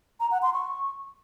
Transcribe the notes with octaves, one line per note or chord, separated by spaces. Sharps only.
A#5
F#5
C6
C#6